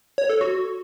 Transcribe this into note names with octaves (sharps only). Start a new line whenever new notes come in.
C#5
A4
F#4